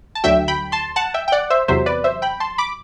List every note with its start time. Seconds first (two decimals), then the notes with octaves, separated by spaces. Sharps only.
0.15 A5
0.24 D2 D3 F#3 E5 G5
0.48 G5 B5
0.72 A5 C6
0.96 F#5 A5
1.14 E5 G5
1.28 G5
1.32 D5 F#5
1.50 C5 E5
1.68 E2 C3 F#3 C5 E5
1.86 B4 D5
2.04 C5 E5
2.22 G5 B5
2.40 A5 C6
2.58 B5 D6